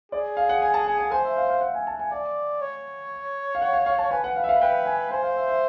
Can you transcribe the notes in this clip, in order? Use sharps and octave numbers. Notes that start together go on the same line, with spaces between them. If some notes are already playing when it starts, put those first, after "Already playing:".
G#4 D5
F5
F#5
G#5
A5
G#5
G#5
C5 G#5
E5
F5
F5
F#5
G#5
A5
G#5
D5 G#5
C#5
F5
F#5
F5
F5
A5
B4 G#5
F#5
F5
E5
F5
B4 G5
G#5
C5 G#5
F5
E5
E5